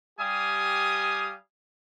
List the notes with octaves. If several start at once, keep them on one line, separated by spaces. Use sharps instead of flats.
G3 G4 F5 G#5 D#6